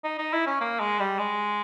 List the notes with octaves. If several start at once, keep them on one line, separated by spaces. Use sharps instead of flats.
D#4
D#4
E4
C#4
A#3
G#3
G3
G#3